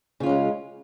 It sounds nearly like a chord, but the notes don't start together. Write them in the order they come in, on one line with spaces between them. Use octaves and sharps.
C#3 F4 C#4 G#3